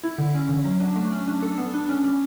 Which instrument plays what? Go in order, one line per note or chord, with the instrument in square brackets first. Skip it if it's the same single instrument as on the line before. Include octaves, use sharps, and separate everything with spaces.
[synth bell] E4
D3
C#4
D3
F#3
D4
A3
C#4
D4
A4
B3
D4
C#4
C#4